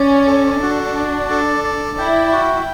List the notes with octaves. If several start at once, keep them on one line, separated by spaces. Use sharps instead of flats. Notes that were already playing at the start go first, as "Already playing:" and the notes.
Already playing: C#4 D5
A4
D4 F#4
D5
A4
D5
E4 G5
F#4